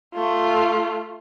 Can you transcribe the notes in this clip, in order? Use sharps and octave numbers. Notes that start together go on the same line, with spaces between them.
A3 F4